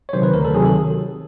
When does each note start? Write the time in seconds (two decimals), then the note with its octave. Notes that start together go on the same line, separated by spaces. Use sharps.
0.09 C#5
0.13 C3 D#3 F#3 C5
0.23 B4
0.34 D2 A#4
0.45 A4
0.54 C3 D#3 F#3 G#4
0.65 A4